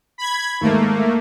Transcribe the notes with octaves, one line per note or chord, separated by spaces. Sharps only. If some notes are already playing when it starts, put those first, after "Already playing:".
B5 G#6
D#2 G#2 A3 A#3